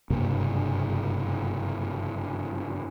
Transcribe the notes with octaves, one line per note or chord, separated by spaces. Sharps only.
F#1 G2 C3 A#3